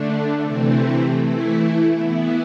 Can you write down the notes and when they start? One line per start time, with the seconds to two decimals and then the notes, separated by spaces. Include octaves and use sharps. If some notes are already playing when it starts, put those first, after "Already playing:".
Already playing: D3 A3 D4
0.42 C3 E3 A3 C4
1.18 E3 A3 E4
1.94 E3 B3 E4